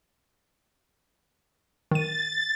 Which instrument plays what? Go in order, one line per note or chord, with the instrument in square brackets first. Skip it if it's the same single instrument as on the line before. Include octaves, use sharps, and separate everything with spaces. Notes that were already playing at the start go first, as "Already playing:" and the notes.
[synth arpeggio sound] D#3 D#7 [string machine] A6